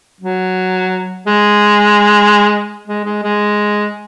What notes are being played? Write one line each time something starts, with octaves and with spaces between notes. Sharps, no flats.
F#3
G#3
G#3
G#3
G#3